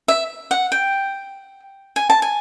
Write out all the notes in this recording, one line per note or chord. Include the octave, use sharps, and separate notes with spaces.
E5
F#5
G5
G#5
A5
G#5